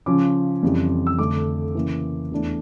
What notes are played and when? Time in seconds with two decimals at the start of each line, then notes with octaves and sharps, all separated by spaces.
0.06 C#3 F3 C#4 D6
0.63 F2 C#3 E3 G3
1.07 E6
1.19 F2 D3 A3 D6
1.75 C#3 E3 A#3
2.31 E2 E3 A3 D4